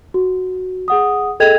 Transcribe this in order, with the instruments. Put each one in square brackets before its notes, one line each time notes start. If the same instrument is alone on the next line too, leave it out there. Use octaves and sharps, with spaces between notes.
[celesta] F#4
G#4 F#5 D#6
G#4 A4 D#5 G5 G#6 F7